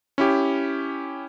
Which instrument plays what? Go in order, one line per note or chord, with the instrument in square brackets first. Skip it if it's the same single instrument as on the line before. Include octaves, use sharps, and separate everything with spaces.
[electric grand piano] C#4 E4 G4